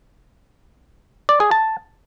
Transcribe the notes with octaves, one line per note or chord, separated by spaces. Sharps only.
D5
G#4
A5